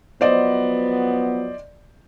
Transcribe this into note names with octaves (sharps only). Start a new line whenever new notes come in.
F3 F#3 B3 C5 D5 D#5